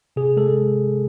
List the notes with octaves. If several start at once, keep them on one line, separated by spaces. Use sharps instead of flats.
C3 G#4
G#3 A4